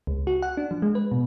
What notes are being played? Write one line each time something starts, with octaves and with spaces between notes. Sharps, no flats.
C#2
F#4
F#5
D4
F3
G#3
B4
B2